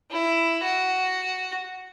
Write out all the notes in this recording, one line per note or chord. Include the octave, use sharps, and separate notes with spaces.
E4
F#4